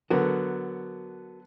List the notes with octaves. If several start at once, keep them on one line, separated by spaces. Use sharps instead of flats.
D3 F#3 B3 F#4 A#4